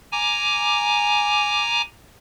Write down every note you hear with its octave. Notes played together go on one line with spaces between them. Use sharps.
G#5 A#5 D6